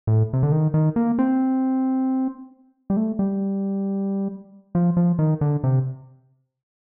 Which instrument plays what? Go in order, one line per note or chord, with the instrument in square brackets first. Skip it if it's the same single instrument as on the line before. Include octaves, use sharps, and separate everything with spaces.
[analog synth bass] A2
C3
D3
D#3
D#3
A#3
C4
G3
A3
G3
F3
F3
D#3
D3
C3